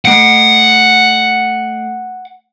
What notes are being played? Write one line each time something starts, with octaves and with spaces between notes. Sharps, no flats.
A3 F#5 C7 D7